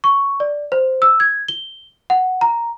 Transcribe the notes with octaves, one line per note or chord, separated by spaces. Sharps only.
C#6
D5
C5
E6
G#6
G7
F#5
A#5